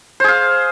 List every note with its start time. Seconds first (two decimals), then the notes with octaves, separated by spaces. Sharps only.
0.20 C5
0.24 G#4
0.28 F5